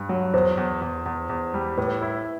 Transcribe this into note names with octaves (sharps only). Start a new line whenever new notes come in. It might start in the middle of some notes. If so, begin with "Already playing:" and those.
Already playing: G2
F#3
E2 C5
E2
E2
E2
E2
G3
A2 B4
E4